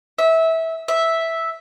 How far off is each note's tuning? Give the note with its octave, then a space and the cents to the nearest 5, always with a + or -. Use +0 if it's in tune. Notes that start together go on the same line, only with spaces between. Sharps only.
E5 -20
E5 -5